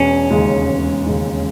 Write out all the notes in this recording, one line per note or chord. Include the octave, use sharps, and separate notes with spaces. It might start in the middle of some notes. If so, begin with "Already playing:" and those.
Already playing: E1 C#4
D#2 C#3 G#3
E1
D#2 C#3 G#3